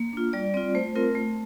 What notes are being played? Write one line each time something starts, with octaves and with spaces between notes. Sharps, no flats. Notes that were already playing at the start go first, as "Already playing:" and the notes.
Already playing: A#3
D4 F4
G3 D5
C4 F4 D5
A3 C5
C4 F4 A#4
A3